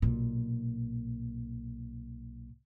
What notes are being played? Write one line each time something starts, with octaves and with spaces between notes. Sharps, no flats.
B1 A#2